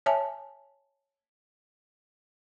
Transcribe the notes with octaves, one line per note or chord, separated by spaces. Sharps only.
C#5 E5 G#5 A5